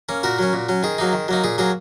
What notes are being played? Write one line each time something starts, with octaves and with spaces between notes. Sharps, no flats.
A#3 C#4
A#2 F#4 A#4
F#3 C#4
A#2
F#3 C#4
D#3 G#4
F#3 A#3 D#4
D#3
F#3 A#3 D#4
A#2 G#4
F#3 A#3 G#4